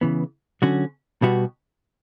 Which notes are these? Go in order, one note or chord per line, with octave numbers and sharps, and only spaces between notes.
C#3 E3 B3
D3 F#3 C#4 F#4
B2 G3 B3 F#4